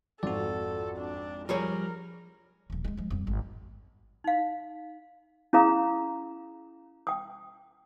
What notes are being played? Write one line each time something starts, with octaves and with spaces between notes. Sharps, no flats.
G#1 F2 F#4 A4 D5
D4
F3 G3 G#4 A#4 C#5
D#1 F3
D#3 G#3
F3 G#3
F2 G3
G#1
D#4 F5
C#4 E4 G#4 F5 A#5 D#6
G5 D#6